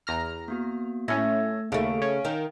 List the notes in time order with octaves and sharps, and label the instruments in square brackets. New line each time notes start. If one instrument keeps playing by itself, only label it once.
[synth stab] E2 A#5 F6
[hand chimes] A#3 B3 F#4
[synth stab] A2 C#4 [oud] A3 [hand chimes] E6 G#6 A#6
[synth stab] D#2 [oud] C#3 A3 [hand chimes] F5 D7
[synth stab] C#4
[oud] D#3 D#4